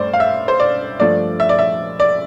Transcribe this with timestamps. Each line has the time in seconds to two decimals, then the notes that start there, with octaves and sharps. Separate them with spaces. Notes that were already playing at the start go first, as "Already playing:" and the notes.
Already playing: G2 A3 C5 D5
0.13 F5
0.20 E5
0.48 C5
0.60 D5
1.00 G2 F3 A3 D4 D5
1.40 E5
1.49 D5
1.59 E5
2.00 D5